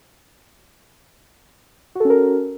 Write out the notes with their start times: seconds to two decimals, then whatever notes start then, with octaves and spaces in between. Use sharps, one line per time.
1.95 F#4
2.00 A4
2.05 C#4
2.10 A#4